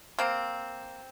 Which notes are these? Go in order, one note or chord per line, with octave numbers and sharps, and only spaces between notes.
A#3 C4